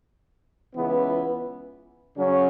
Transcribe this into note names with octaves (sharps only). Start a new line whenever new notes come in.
C#2 C#3 E3 B3
C#3 F#3 C#4